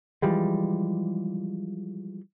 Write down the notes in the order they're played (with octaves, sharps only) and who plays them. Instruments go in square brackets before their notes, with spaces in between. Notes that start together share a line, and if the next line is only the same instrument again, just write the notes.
[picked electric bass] E3 F3 G3 G#3